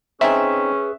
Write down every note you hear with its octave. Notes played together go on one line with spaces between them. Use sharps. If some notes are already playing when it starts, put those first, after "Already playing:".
C4 C#4 D#4 G#4 B4 E5 G#5